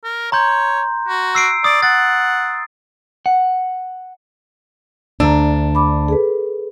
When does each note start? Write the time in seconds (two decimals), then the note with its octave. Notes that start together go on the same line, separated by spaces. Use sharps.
0.04 A#4
0.32 C#5 A#5 C6 G6
1.08 F#4
1.35 E6 C7 D7
1.64 D5 D#6
1.83 F#5 A6
3.26 F#5
5.20 D2 D4 A#5 E6
5.75 B5 D6
6.08 G#4 A4 B4